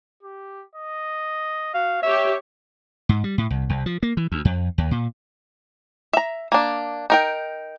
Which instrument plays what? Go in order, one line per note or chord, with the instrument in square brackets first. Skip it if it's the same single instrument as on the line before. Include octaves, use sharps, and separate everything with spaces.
[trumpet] G4
D#5
[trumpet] F#4 [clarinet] F5
[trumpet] C#4 [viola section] G4 C#5 [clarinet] E5
[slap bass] G#2
G3
A2
C2
C2
F3
A#3
E3
D2
F2
D#2
A#2
[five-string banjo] E5 A#5
A#3 D4
D#4 A#4 G5